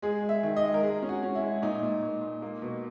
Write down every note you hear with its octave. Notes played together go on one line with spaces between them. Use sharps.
G#3 G#4
G#3
E5
D#3
D#5
G#3
A#4
G#3 G#4
C#4
F#4
C#4
E4
G#3
A#2 D#4
A#2
A#2
A#2
A#3
B2